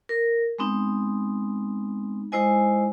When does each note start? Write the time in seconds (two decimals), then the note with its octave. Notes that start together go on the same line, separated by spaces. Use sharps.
0.09 A#4
0.58 G#3 B3 C4 D#4
2.32 G#3 D#4 E4 C5 D#5 G#5